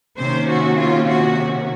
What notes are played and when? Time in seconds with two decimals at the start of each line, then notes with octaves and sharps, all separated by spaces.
0.18 C3 D#3 A#3 C#4 C5
0.48 F#4
0.78 F4
1.09 F#4